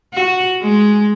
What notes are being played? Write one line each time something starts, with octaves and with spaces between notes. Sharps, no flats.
F#4
G#3